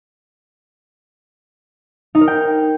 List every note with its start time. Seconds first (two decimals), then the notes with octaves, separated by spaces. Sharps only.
2.15 D#4
2.21 A#4
2.28 G5